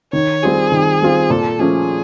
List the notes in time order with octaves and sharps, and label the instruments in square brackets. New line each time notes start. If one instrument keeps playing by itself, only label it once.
[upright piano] D#3 [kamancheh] C#5
[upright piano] G3 C4 F4 [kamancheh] G#4
[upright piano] D#3
G3 C4 F4
[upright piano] A#2 [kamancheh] A4
[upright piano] F3 A3 C#4 [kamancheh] G#4